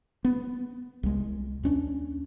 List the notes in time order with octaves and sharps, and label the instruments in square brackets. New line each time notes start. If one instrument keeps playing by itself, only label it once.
[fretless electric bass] B3
C2 G#3
D#2 C#4 D4